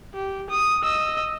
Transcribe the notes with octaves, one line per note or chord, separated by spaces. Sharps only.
G4
D#6
D#5 E6